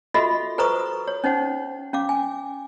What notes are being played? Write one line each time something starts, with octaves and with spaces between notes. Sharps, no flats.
F4 F#4 A4 D#5 E5 B5
A4 B4 C5 A#5 C#6 D#6
C#5
C#4 D#4 C5 F#5
C#4 F5 D6
G#5